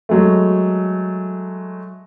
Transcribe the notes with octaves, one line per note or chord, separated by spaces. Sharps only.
F#3 G#3 A3